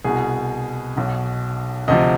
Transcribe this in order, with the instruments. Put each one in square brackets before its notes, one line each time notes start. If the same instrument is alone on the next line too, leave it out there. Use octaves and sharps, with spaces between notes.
[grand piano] C2 B2 G#4
B1 B2
D2 C3 F3 D#5